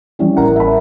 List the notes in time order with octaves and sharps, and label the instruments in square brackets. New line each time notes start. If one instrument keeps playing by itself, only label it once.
[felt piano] E3 G3 C#4
[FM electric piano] A1 A#4 F#5
[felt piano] E5 B5